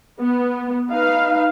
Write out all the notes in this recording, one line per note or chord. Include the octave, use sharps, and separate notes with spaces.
B3
D#4 B4 F5